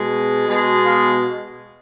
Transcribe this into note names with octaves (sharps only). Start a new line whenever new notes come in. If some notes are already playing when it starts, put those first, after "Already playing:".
Already playing: B2 G#3
B2 G#3
F5